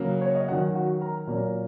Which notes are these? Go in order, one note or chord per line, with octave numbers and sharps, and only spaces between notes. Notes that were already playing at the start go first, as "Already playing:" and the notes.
Already playing: C#3 F#3 A#3
C#5
D#5
D#3 F#3 C#4 F#4 F#5
F#4 F#5
A#4 A#5
A#2 F#3 A#3 C#4